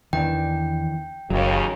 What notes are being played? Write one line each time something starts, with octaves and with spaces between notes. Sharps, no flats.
E2 D#3 E3 D4 G5
F#1 D#2 C#3 F#3